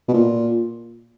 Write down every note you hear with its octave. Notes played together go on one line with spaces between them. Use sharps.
B2
A#2